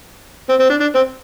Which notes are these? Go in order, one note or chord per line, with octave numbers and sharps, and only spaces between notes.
C4
C4
D4
D4
C4